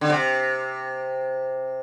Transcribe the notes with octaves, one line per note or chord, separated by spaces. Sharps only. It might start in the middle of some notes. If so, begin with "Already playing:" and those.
D3
C3